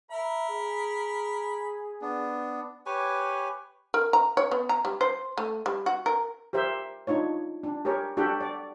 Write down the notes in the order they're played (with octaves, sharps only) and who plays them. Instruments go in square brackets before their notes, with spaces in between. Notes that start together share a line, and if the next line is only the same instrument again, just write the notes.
[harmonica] A#4 B5 [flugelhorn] E5
[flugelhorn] G#4
[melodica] B3 D4
G4 B4 C#5 G#5
[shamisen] A#4
A#5
C#5
B3
A#5
G3
C5
A3
G3
F#4
A#4
[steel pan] G4 A#4 C5 E5
D4 D#4 F4 C#5
D4
G4 G#4 A#4 C#5
D4 F#4 G4 A4 F#5 G5
D5